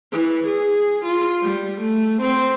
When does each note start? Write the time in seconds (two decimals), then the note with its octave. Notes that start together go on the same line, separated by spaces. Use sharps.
0.12 E3
0.47 G#4
1.04 F4
1.43 G3
1.80 A3
2.22 C4